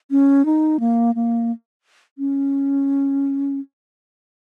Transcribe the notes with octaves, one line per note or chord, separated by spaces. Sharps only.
C#4
D#4
A#3
A#3
C#4